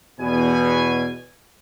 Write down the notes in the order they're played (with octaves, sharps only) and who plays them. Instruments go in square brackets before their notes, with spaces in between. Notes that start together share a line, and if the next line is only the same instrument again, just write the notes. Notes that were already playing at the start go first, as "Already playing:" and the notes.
[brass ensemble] E2 B2 G#5